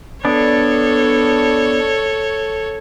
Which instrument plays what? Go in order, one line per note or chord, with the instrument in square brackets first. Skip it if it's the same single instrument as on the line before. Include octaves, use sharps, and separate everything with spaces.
[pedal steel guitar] B3 D4 [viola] A4 C#5